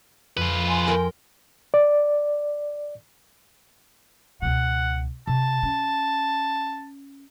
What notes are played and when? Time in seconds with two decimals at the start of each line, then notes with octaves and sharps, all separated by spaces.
0.37 F2 F4 B4
0.68 G#5 C6
0.88 A#4 G5
1.74 D5
4.42 C#2 B2 F#5
5.27 C3 A5
5.63 C#4